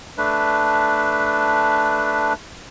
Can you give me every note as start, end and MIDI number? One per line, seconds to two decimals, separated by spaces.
0.18 2.33 57
0.18 2.33 62
0.18 2.33 71